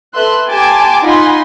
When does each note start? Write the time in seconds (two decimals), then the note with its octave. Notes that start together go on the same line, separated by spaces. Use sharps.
0.15 A4 B4 E5 C6 F#6
0.49 G4 G#5 A5 C6 D6
1.04 D#4 F4 F#5 G#5 B5 C6